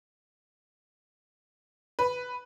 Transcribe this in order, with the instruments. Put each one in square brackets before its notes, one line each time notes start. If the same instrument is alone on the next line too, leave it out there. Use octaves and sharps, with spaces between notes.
[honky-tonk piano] B4